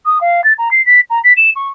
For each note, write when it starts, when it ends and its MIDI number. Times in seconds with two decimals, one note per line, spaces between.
0.06 0.19 87
0.21 0.44 77
0.44 0.53 93
0.58 0.69 82
0.71 0.84 96
0.86 1.00 95
1.10 1.19 82
1.24 1.33 95
1.37 1.50 100
1.56 1.69 85